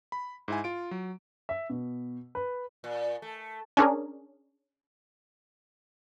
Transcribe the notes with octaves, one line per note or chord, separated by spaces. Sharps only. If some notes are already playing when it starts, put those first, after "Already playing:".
B5
G#2 E4 G#5
F4 D7
F#3
E5
B2
B4
A#2
A3
C#4 D4 G#4 A#4